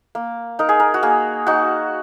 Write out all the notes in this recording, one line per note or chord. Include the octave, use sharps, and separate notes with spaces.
A#3
D#4 A#4
G#4
A#4
F#4
A#3 G#4
D#4 F#4